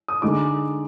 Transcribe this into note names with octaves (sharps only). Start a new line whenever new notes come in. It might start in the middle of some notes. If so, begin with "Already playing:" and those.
D#6
D3 G#3 D#4 D6